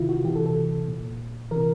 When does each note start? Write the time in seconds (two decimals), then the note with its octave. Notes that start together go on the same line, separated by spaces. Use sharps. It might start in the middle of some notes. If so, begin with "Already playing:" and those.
Already playing: C3 D#3 E4 F4
0.09 F#4
0.24 E3 G4
0.28 C3
0.36 A4
0.46 A4
0.88 A#2
1.51 C3 E3 A#4